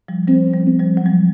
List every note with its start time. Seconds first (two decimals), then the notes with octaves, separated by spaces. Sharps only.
0.08 F3 G3
0.28 F3 G3 C4
0.53 F3 G3
0.67 C4
0.80 F3 G3
0.97 F#3
1.06 F3 G3